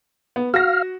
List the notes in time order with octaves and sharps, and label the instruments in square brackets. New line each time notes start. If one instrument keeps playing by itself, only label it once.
[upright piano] B3
[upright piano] F#4 A#6 [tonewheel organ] F5 F6